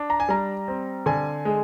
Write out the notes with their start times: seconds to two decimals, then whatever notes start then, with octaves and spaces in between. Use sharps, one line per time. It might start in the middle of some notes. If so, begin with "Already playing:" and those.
Already playing: D4
0.10 A#5
0.20 G#5
0.29 G3 A#5
0.68 C4
1.06 D3 G#5
1.45 G#3